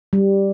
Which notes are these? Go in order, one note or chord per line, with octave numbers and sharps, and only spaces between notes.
G3